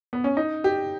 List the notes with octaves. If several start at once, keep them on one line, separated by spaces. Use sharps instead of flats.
B3
C#4
D#4
G4